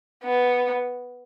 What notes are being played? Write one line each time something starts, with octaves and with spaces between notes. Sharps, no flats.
B3